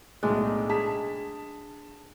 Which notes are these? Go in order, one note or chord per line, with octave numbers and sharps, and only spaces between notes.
B1 A2 G#3 A3 D4
G#4 A5 B6